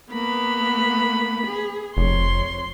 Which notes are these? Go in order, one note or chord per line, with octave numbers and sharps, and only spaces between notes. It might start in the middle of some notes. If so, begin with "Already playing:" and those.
A#3 B3 B5
G#4
F1 F2 C#5 C6